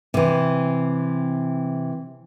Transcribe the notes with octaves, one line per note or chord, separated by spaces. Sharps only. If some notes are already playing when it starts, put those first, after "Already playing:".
C3 E3